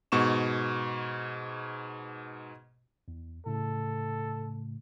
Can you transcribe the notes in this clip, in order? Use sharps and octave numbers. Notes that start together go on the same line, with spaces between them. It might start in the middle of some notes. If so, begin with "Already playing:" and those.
G#2 B2 C#6 E7
E2
A2 C#3 A3 A4